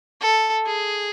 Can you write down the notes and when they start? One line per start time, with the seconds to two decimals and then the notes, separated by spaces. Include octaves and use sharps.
0.21 A4
0.66 G#4